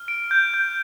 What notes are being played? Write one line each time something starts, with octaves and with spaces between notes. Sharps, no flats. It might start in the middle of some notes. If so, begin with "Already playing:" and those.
Already playing: F6
D7
G6
G6